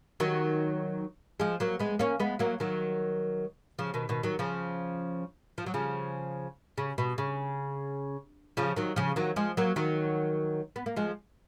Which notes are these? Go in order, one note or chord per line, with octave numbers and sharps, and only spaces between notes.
D#3 F#3
F3 G#3
F#3 A#3
G#3 B3
A#3 C#4
G#3 B3
F#3 A#3
D#3 F#3
C#3 F3
B2 D#3
B2 D#3
D#3 F#3
C#3 F3
F3
F#3
C#3 F3
C#3
B2
C#3
C#3 F3
D#3 F#3
C#3 F3
D#3 F#3
F3 G#3
F#3 A#3
D#3 F#3
B3
A#3
F3 G#3